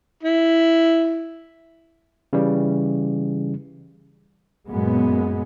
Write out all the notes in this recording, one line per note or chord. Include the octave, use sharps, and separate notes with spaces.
E4
C#3 E3 G3
F#2 A#2 G#3 B3